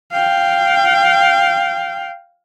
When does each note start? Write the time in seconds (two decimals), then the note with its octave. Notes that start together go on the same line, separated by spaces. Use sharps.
0.12 F5 G5